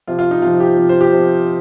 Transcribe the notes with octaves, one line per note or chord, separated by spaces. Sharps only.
C3 F3 F4
F4
D#4
C3 F3 F4
G4
C3 F3
C5
G4
C3 F3